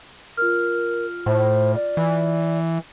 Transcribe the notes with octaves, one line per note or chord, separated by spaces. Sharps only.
F4 A#4 F6
A2 C5
D5
E3